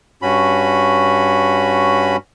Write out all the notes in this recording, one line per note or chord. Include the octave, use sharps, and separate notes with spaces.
G2 C#4 F#4 B5